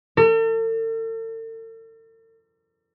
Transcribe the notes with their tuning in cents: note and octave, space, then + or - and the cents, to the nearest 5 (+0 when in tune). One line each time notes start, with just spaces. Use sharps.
A4 +45